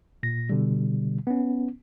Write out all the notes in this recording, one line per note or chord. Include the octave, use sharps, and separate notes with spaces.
A#2 A#6
B2 D3 G3
B3 C#4